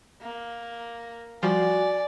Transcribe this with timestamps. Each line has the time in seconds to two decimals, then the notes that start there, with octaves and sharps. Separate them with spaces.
0.22 A#3
1.43 F3 G3 F4 F#4 D5 G#5